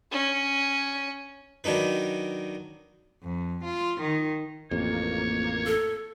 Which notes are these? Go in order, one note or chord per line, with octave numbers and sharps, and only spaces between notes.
C#4
D#3 F#3 D4 D#4 B4
F2
F4
D#3
A1 F2 A#3 C#5
A4